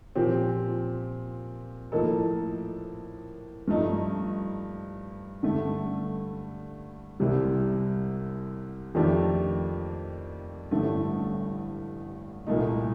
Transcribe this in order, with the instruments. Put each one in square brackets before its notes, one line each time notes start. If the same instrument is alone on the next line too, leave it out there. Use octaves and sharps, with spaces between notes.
[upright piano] A#2 F3 C4 G4
A2 F3 A#3 D#4 A4
G2 F3 A3 D#4
G2 D3 A3
C2 C3 G3
F2 D#3 A3 D4 G4
A1 G2 D3 A3
C2 A#2 A3 D#4